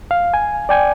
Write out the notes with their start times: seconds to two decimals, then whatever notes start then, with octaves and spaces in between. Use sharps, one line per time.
0.11 F5
0.34 G#5
0.69 D5 G5 G#5